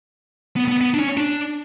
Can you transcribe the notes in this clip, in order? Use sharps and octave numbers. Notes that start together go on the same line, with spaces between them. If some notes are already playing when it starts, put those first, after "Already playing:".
B3
B3
B3
D4
C#4
D4